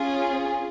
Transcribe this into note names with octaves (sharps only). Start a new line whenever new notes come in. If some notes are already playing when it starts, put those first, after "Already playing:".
Already playing: C#4 F4 G#4